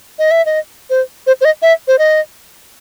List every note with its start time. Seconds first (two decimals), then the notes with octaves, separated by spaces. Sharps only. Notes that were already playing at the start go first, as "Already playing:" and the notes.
0.19 D#5
0.31 E5
0.46 D#5
0.90 C5
1.27 C5
1.41 C5
1.45 D#5
1.62 E5
1.88 C5
1.99 D#5